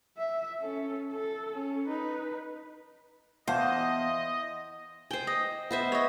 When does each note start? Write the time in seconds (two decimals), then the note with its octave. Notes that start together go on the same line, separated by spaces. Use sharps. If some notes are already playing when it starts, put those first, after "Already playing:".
0.17 E5
0.61 C#4 A4
1.12 A4
1.54 C#4
1.88 D#4 B4
3.48 E2 C5 D#5 F5 A5
5.11 C5 G5 G#5
5.27 D#5
5.71 B3 C5 E5
5.92 C#5 D#5